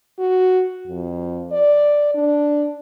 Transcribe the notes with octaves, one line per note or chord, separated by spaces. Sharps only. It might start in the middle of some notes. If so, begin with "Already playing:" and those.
F#4
F2
D5
D4